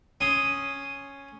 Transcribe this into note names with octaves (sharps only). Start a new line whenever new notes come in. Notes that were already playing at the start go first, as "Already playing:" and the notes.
C#4 C6 D#6